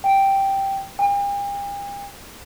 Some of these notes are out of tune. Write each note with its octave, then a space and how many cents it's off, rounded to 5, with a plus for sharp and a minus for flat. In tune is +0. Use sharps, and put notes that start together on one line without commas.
G5 -5
G5 +45